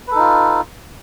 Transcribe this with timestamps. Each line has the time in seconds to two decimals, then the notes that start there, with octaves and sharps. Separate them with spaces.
0.08 B4
0.11 A4
0.15 D#4
0.19 F4